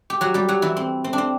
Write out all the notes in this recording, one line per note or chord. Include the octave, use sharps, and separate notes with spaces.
G4
F#3 F#4
G3 G4
F#3 F#4
E3 E4
C4
C4
D4
C4